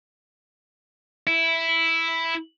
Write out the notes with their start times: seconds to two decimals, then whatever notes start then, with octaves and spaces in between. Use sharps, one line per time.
1.27 E4